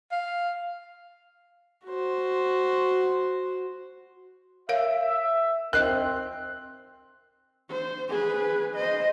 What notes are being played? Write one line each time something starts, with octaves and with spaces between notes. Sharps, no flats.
F5
F#4 C5
A#4 C#5 E5 F5
C4 A#4 D#5 F#6
C5
G#4 B4
C5 D#5